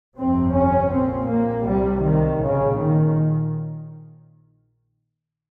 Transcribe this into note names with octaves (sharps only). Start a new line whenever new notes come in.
G1 F2 C3 C4
C#4
A#1 A#2 C4
A#3
C2 C3 G3
D#3
A#1 A#2 C#3
D#3